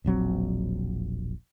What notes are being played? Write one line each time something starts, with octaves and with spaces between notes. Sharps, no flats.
E1 A#1 F#3 C4